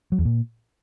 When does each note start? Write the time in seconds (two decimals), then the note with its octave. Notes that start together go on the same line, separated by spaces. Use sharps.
0.12 F#3
0.19 E2
0.25 A#2